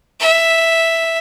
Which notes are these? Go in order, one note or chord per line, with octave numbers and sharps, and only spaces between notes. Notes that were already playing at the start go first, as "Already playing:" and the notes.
E5